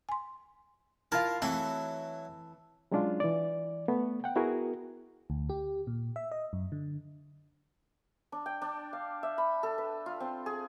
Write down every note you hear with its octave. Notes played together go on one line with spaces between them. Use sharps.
G#5 C6
E4 F4 A#4 F5 A5
E3 F#3 A3 C4 E4 A4
F#3 G#3 C#4 D4 F4
E3 D5
A3 B3
F#5 G5
B3 E4 F#4 G#4 A#4
D2
G4
A#2
E5
D#5
F#2
D3
D4
G5
D4
F5
E5
B5
A4
B4
F4
C4
G#4